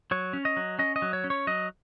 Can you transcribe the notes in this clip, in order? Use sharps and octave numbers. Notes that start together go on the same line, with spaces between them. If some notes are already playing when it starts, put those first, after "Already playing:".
F#3 C#5
C#4
D#5
F#3
C#4 D#5
D#5
F#3
C#5
C#4
C#5
F#3 D#5